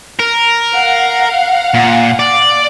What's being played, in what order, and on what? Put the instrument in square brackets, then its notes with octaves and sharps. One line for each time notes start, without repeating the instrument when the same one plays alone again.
[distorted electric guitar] A#4
[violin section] F5 F#5
[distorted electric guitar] A#2
D5